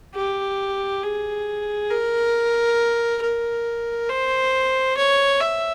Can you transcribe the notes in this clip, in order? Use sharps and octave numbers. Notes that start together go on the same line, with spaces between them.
G4
G#4
A#4
A#4
C5
C#5
E5